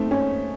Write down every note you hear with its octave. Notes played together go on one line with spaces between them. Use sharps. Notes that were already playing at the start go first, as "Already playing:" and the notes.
Already playing: A3 C4 D#4
C#4